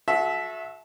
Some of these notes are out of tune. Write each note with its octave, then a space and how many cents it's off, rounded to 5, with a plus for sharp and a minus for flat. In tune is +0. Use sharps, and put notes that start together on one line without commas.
F#4 -30 A4 -35 E5 +0